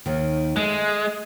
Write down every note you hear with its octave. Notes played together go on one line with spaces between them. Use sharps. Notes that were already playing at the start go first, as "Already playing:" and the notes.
D#2 D#3
G#3 A3